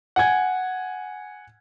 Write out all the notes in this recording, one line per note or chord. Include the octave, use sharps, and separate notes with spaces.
F#5 G#5 G#6